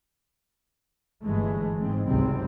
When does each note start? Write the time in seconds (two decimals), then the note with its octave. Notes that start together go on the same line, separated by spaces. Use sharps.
1.22 G1 G2 E3 G#3 A3
1.76 G#2 C4
2.07 G#1 C#2 G2 C3 G3 C4